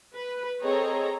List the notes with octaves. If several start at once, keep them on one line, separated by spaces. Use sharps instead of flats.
B4
C4 G#4 A4 C#5 D#5 A#5